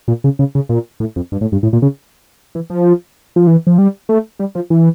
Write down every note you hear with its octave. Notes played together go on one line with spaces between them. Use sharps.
A#2
C#3
C#3
C#3
A#2
A2
F2
G2
A2
G2
A2
A#2
C#3
E3
F3
F3
E3
F3
G3
A3
G3
F3
E3